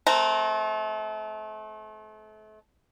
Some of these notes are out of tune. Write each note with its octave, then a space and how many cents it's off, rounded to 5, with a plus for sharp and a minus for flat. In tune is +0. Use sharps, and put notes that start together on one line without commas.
A3 -35 C4 +0 A#4 -20